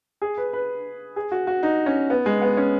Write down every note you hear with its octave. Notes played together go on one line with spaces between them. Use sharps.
G#4
B4
B4
G#4
F#4
F#4
D#4
C#4
B3
G#3
B3
C#4